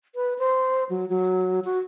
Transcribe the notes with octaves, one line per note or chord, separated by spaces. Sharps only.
B4
C5
F#3
F#3
F#4